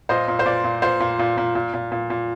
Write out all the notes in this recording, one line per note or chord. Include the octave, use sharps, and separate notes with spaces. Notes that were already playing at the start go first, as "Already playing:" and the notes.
A#2 C5 D#5
A#2
C5
A#2 D5
A#2
A#2 C5
A#2
A#2
A#2
A#2
A#2
A#2
A#2